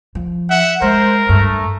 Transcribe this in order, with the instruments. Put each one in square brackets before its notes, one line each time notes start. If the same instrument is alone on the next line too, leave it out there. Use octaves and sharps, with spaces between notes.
[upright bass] F3
[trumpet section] E5 F#5
[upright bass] G#3 [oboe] A#4 [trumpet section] C5
[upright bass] G2 [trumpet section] A3